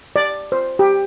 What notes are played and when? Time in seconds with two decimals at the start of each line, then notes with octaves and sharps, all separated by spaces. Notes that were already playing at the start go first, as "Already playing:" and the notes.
0.16 D5
0.52 C5
0.79 G4